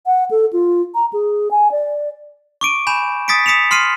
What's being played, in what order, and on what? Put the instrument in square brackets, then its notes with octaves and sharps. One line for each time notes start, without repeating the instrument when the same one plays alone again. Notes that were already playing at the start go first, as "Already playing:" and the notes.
[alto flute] F#5
A4
F4
A#5
G#4
G#5
D5
[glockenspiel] C#6 D6 D7 D#7
G#5 B5 G6 E7
D#6 A6 B6 C#7 D7
D#6 B6 C#7 E7 F7
C6 F6 C7 D#7